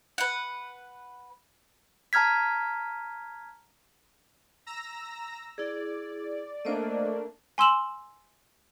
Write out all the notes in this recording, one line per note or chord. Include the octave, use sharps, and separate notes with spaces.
B4 F#5
A5 A#5 F6 G#6 B6
A#5 E6 A#6
E4 G#4 D5
A3 A#3 D4 C5 D5 D#5
G#5 C6 E6 E7 F#7